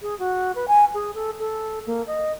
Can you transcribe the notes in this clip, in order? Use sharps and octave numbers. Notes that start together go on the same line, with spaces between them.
G#4
F#4
B4
G#5
G#4
A4
A4
A#3
D#5